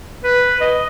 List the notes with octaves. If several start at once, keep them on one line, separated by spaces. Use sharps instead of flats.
B4
D#5